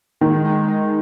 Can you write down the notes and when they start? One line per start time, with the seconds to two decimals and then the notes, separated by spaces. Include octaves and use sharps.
0.21 D#3 G#3
0.45 G#3
0.68 D#4